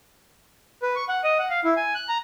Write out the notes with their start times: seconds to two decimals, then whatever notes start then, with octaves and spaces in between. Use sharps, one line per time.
0.82 B4
0.96 C#6
1.09 F#5
1.24 D#5
1.39 F#5
1.50 F5
1.65 E4
1.77 G#5
1.95 F#6
2.09 A#5